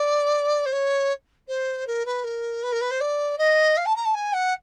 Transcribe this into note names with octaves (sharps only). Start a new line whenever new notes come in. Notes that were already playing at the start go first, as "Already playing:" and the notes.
Already playing: D5
C5
C#5
C5
A#4
B4
A#4
B4
A#4
B4
C5
D5
D#5
F5
A5
A#5
A5
G#5
F#5